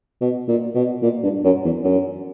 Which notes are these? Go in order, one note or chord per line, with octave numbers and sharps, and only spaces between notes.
B2
A#2
B2
A#2
G2
F#2
E2
F#2